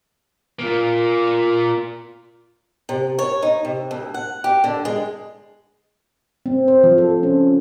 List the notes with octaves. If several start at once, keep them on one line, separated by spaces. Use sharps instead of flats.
A#3 F4
C3
C#5
D#4
C3
D2
F#5
G4
D3
G#3
C4
C5
F3
A4
C#4